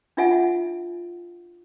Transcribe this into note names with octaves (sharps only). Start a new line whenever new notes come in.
D4 D#4 F4 E5 F#5 G#5